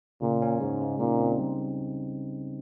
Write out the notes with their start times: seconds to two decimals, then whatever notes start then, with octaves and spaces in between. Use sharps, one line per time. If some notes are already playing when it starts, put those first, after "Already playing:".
0.22 A#2 C#3
0.42 C#4
0.60 G#2 G#3
0.81 C#3
0.99 A#2 D#4
1.19 C4
1.39 G3